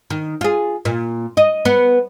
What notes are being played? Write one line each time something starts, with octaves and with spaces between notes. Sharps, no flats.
D#3
F4 G#4
A#2
D#5
B3